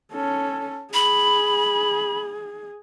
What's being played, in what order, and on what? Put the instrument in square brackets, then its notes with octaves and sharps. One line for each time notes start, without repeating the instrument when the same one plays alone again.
[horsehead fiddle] C#4 A4
[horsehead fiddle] G#4 [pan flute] B5